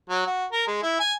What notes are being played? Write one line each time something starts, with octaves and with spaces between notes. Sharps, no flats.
F#3
F#4
A#4
G#3
E4
G#5